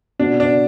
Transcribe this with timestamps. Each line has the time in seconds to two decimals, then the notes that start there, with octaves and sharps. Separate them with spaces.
0.19 B2 D4
0.40 D4